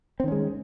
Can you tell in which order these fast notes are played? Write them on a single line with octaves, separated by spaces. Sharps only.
C4 D#3 C#4 G#3